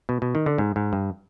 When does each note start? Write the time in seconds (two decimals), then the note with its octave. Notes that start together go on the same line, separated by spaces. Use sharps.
0.09 B2
0.22 B2
0.35 D#3
0.46 D3
0.58 G#2
0.76 G#2
0.93 G2